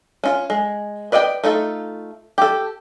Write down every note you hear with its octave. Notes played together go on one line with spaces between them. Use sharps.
C#4 F4
G#3
B4 D5 D#5 F5 G5
A3 D#4 F4 A4
G4 A4